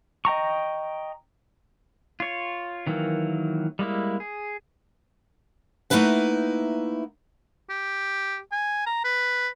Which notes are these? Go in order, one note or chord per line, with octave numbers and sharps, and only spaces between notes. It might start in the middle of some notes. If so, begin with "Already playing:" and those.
D#5 G5 A#5 C#6
F4 C#5
D#3 E3 F#3 A#3
G3 G#3 A#3 E4
G#4
A3 A#3 D#4 E4 B4 F#5
G4
G#5
A#5
B4